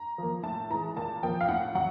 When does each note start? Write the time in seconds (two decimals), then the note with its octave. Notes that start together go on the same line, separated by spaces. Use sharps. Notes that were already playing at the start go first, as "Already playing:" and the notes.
Already playing: A#5
0.18 F3 A#3
0.43 A2 A5
0.70 E3 G#3 A#5
0.96 A#2 A5
1.23 F3 A#3 G5
1.41 F5
1.48 A2 F#5
1.75 F#3 F#5